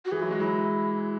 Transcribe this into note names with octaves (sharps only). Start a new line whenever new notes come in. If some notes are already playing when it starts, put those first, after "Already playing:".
F#4
E3 G#4
F#3 E4
G#3 F#4
F#3 E4